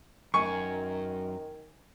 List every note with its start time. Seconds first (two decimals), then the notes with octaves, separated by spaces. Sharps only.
0.34 F#2 D#3 G#5 C#6